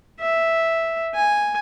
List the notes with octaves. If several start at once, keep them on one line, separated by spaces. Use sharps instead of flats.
E5
G#5